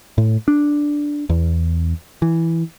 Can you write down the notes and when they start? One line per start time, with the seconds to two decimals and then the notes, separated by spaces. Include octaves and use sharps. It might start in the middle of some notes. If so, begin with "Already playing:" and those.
0.18 A2
0.48 D4
1.30 E2
2.22 E3